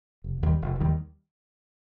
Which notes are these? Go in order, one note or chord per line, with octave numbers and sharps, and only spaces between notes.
F1
D#2 D#3 G3
F1
D#2 D#3 G3